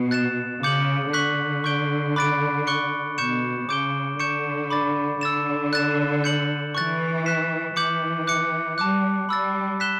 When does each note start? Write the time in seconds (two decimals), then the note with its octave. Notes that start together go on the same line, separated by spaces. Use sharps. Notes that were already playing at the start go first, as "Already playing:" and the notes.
Already playing: B2
0.11 F#6 A6 E7
0.63 C#3 D6 G6 C#7 F#7
1.13 D3 C#6 F#6 B6 F#7
1.64 C#6 G6 D7 G7
2.16 B5 D6 F#6 A6 D7
2.67 C#6 F#6 C#7 G7
3.18 B2 C#6 G6 C#7 E7
3.68 C#3 D6 G6 D7 G7
4.20 D3 C#6 G6 C#7 E7
4.70 B5 D6 A6
5.21 D3 E6 A6 E7
5.73 F#6 A6 E7
6.24 G6 C#7 F#7
6.74 E3 C#6 F#6 A6
7.26 F#6 B6 E7
7.76 E3 D6 G6 C#7 F#7
8.27 D6 F#6 C#7
8.78 G3 A5 D6 F#6
9.29 G3 B5 E6 A6
9.80 F#6 B6 E7 G7